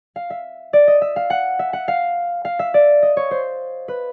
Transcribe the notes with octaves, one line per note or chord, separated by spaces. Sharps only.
F5
E5
D5
D#5
E5
F5
F#5
E5
F#5
F5
F5
E5
D5
D#5
C#5
C5
B4